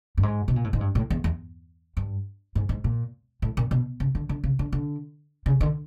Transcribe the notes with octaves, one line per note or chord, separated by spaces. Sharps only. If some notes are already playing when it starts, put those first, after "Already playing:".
G2
G#2
B2
A#2
A2
G#2
G2
A2
E2
E2
G2
G#2
G#2
A#2
A2
A#2
B2
C#3
D3
D3
C#3
D3
D3
C#3
D3